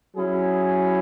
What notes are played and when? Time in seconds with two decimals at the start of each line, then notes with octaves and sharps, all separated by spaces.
0.15 F#3 C#4 E4 G#4